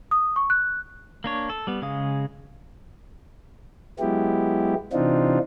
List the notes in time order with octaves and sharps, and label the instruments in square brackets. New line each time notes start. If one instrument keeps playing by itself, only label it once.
[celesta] D#6
C#6
F#6
[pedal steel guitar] A#3 D4 C#5
A4
G3 B3
C#3 G#3 F5 D#6
[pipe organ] F#3 G#3 B3 E4 G4
C3 E3 C4 D4 D#4 F4